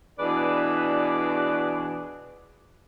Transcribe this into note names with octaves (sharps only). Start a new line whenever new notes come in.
B2 E3 D4 G#4 B4 D5